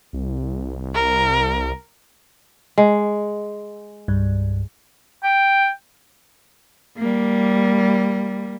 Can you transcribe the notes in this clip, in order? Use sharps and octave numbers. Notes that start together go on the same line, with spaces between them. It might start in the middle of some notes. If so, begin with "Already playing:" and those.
C2
A#4
G#3
C2 G2
G5
G3 A#3